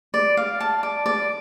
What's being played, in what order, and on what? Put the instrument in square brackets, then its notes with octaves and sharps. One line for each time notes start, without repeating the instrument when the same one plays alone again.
[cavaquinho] D5
F5
A5
D5
D5